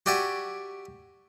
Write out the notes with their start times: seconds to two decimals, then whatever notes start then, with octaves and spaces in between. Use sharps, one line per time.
0.06 F#4 G4 D5 E5 G#5 C#6